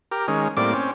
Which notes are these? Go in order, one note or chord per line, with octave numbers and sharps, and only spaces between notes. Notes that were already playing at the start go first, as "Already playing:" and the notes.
G4 A#4
D#3 G#3 C#4
A2 G3 A#3 C4 D5 D6
C4 C#4